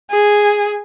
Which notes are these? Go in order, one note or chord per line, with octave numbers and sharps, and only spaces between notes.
G#4